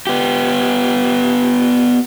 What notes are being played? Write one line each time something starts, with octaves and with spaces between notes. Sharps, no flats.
B3 G4